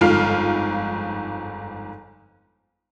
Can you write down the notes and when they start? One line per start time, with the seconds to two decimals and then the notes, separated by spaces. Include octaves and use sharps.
0.01 G1 F2 G#2 F4 F6 C7